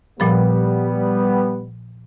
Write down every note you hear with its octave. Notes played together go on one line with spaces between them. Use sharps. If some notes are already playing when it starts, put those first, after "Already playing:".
A#2 F3 G3 B3 B5